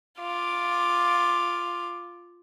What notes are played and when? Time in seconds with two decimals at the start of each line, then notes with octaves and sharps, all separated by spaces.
0.19 F4 D6